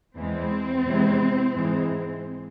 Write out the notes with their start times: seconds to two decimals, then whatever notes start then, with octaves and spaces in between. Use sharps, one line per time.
0.16 E2 E3 G#3 C4
0.86 E2 C3 E3 G#3
1.54 G#2 E3 G#3